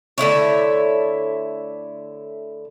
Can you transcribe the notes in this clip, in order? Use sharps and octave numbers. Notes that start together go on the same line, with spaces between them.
D3 A3 E4 C#5